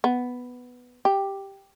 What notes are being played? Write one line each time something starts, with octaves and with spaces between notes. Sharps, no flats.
B3
G4